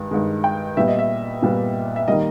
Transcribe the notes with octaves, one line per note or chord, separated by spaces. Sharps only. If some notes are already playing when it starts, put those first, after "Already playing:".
Already playing: G2 D#3 G#3
G2 D#3 G#3
G5
A#2 G3 B3 E5
D#5
E5
A#2 G3 B3
E5
D#3 G3 A#3 D#5